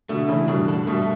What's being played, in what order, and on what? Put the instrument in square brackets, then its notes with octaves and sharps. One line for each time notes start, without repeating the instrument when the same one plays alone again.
[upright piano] B2 D3 [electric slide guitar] A3
[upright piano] A2 C#3 [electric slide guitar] E3
[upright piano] G2 B2 [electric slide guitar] D4
[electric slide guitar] A4
[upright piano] G2 B2 [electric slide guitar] A3